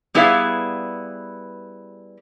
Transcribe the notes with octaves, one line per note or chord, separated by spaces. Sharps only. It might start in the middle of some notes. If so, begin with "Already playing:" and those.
G3 B3 E4 G#4 B4 F5